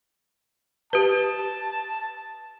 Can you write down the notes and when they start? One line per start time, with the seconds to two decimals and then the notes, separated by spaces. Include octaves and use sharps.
0.93 G4 B4 A5